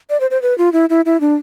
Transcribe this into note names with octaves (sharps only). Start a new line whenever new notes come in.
D5
C5
C5
B4
F4
E4
E4
E4
D4